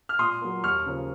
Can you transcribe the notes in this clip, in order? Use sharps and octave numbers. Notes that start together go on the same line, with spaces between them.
F6
A#2 C6 D#6
F#3 A#3
D#2 C#6 F6
C#3 F3 A#3